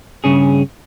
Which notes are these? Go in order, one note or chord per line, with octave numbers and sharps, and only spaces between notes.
G2 C#3 C#4 G#4